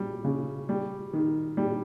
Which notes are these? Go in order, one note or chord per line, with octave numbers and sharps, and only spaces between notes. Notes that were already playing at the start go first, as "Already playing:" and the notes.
Already playing: G3
C#3
G3
D#3
G3